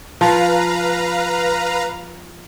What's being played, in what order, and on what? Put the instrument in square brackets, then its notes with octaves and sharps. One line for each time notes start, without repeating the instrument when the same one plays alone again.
[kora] F3 [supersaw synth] B4 F5 A#5